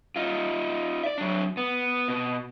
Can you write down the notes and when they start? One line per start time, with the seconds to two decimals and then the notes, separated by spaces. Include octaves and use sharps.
0.16 D#4 F4
1.03 D5 E5
1.18 F#3 D4
1.57 B3
2.08 B2